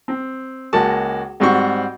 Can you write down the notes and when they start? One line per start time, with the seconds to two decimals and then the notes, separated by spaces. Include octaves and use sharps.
0.08 C4
0.73 C#2 G#3 A#3 F#4 A5
1.40 G#2 G3 C4 F#4 F#5 C#6